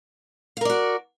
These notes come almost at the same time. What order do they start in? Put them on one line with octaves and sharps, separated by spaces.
F5 A#4 D5 F#4